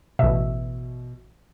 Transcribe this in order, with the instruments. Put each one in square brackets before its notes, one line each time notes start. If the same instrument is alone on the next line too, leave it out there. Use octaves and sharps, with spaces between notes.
[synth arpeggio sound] A1 E5 [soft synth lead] B2